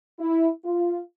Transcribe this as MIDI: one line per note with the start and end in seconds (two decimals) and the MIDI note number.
0.19 0.48 64
0.65 0.99 65